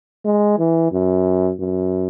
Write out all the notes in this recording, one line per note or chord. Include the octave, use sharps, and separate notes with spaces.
G#3
E3
F#2
F#2